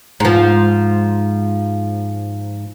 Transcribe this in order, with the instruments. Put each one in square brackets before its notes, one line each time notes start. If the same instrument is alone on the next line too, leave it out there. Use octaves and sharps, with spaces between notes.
[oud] G#2 F3